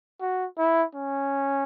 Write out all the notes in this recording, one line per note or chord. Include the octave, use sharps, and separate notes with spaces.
F#4
E4
C#4